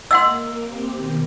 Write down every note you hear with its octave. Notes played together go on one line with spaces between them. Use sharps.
A#3 D#5 F#5 C6 E6
C4 G4
B2 D#3